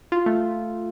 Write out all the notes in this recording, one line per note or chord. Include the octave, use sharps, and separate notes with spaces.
F4
A3